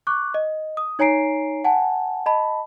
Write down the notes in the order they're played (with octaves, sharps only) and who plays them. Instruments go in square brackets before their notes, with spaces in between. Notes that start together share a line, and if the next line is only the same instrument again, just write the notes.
[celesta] C#6 D6 F#6
D#5
D#6
D#4 C#5 G#5 A#5 C7 D7
F#5 G#5 A5
D#5 A5 B5